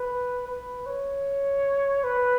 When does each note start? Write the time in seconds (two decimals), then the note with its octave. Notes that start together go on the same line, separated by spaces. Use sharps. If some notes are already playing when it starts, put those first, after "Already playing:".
Already playing: B4
0.47 B4
0.86 C#5
2.04 B4